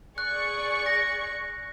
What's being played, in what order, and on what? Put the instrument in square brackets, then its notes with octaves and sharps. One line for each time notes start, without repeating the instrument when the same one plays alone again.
[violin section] G#4 D5 C#6 [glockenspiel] F#6
[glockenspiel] A#6